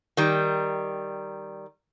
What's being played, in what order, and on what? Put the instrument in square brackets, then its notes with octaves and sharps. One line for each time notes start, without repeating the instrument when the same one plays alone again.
[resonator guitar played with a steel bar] D#3 G3